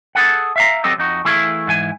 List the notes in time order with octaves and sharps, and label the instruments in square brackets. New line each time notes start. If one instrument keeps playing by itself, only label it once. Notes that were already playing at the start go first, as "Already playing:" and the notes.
[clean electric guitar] G#4 A4 F#5
E5 F5 A#5
F#3 C4 G4 A4 D#5
F2 D#4 F#4
E3 A3 E4 G#4 A4 F5
G#2 E3 G#5